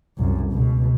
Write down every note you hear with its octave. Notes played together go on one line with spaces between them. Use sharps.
C2 F#2
C#2 B2